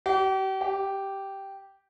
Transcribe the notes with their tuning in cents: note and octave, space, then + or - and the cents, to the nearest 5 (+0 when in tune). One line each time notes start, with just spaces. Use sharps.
G4 -40
G4 -5